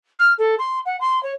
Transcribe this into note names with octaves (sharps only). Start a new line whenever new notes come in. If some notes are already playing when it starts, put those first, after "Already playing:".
F6
A4
C6
F#5
C6
C#5